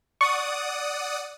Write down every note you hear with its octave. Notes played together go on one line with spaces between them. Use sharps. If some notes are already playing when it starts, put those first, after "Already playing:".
D5 F#5 C#6 D#6